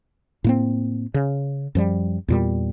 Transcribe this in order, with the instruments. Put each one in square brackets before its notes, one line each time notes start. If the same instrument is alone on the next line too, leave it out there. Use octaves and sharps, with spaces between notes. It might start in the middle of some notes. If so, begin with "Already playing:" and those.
[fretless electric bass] A2 A#3 C4
C#3
F#2 F3 G3
E2 A#2 G3